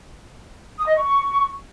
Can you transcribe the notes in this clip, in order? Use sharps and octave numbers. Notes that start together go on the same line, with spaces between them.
D#6
D#5
C#6